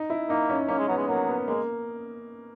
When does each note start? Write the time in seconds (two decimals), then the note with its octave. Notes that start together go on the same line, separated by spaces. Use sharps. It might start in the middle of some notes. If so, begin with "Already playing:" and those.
Already playing: D#4
0.10 E4
0.29 A#3 D#4
0.49 C#4
0.68 A#3 C#4
0.78 G#3
0.88 F#3 B3
0.97 G#3
1.08 F#3 A#3
1.28 B3
1.47 G#3 A#3